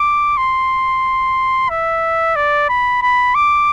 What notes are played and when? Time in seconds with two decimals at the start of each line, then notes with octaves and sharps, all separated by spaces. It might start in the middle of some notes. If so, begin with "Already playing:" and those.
Already playing: D6
0.37 C6
1.69 E5
2.36 D5
2.69 B5
3.02 B5
3.35 D6